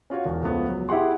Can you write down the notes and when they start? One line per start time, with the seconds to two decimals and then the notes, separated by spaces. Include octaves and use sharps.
0.10 C#4 F4 F#4 C#5
0.25 E1
0.42 C#2 F3 A3 B3
0.69 F#3
0.89 E4 G4 G#4 F#5 C6